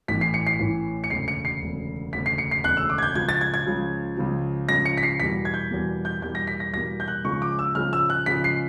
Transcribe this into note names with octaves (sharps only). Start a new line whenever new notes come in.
A1 A2 E3 B6
C7
C#7
C7
A1 A2 E3
C#7
E1 D2 C#3 C7
C#7
C7
E1 D2 C#3
E1 D2 C#3 B6
C7
C#7
C7
E1 D2 C#3 F#6
E6
D6
G#6
G6
C#2 C#3 F3 G#6
A6
G#6
G#6
C#2 C#3 F3
C#2 C#3 F3
C#2 C#3 F3 A#6
C#7
B6
C7
E2 B2 G3 A#3 B6
G#6
G6
E2 B2 G3 A#3
G6
E2 B2 G3 A#3 G6
A#6
B6
A#6
E2 B2 G3 A#3 A#6
G6
F#6
C#2 C#3 F3 G#3 C#6
D6
E6
C#2 C#3 F3 G#3 F6
E6
F#6
C#2 C#3 F3 G#3 B6
C7